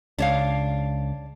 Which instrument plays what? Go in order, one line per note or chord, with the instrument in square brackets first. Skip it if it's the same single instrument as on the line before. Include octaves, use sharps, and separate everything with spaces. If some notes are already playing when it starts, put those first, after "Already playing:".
[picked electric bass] C#2 [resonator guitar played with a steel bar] D4 C#5 F5